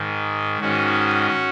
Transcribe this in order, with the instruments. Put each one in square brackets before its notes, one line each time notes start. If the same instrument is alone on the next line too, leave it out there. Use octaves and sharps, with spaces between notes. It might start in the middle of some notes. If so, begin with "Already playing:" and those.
Already playing: [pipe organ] G#2 D#3
G#2 D#3 C#4 F#4